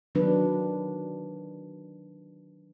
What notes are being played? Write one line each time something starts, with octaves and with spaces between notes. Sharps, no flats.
D#3 F#3 B3 D4 B4